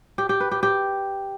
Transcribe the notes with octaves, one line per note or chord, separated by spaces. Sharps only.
G4
G4
B4
G4
G4